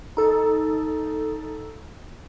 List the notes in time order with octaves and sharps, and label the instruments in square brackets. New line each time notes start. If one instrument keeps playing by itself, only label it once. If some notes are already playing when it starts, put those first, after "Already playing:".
[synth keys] D#4 A4